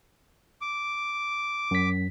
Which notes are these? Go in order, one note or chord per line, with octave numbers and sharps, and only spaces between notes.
D6
F#2 B6